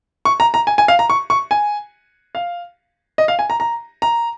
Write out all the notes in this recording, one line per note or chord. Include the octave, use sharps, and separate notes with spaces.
C#6
A#5
A#5
G#5
G#5
F5
A#5
C#6
C#6
G#5
F5
D#5
F5
G#5
A#5
A#5
A#5